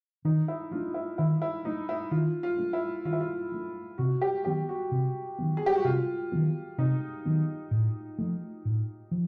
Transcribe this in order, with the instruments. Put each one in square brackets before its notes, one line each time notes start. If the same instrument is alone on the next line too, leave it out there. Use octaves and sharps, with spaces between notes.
[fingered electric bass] D#3 [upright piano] D#4
[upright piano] E4
[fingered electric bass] F#3 A3 D4 [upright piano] F4
[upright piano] E4
[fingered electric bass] D#3 [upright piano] E4
[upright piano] E4
[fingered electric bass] F#3 A3 D4 [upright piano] D#4
[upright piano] E4
[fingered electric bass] D#3 [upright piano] F4
[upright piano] F4
[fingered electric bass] F#3 A3 D4
[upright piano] E4
[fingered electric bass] D#3 [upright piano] F4
[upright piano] E4
F4
[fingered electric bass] F#3 A3 D4
[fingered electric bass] C3 [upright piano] F#4
[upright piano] G4
[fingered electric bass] D#3 F#3 B3 [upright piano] G4
[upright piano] F#4
[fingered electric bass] C3
D#3 F#3 B3
[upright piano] G#4
G4
F#4
[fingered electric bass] C3 [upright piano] F4
[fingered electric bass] D#3 F#3 B3
[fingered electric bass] C3 [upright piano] D#4
[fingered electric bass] D#3 F#3 B3
A2
F3 A3
A2
F3